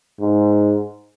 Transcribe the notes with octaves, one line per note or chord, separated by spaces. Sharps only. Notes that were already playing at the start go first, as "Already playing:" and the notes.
G#2